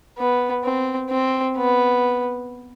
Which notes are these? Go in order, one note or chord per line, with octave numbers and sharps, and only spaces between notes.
B3
C4
C4
B3